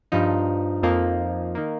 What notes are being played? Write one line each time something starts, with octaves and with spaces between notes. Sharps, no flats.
G2 F3 D#4
F2 F3 A#3 D#4
D#3 A#3